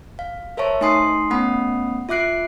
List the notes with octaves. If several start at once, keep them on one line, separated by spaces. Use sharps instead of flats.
F5
A#4 C5 C#5 E5 A5 C#6
A3 D#4 G#5 C6 D#6 C7
A3 B3 C#4 F#5 B5 D#6
F4 E5 D6 F#6 C7 D7